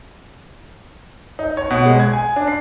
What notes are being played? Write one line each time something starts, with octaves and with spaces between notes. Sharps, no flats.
D#4
C#5
B2
G#3
G#6
G#5
D4
C7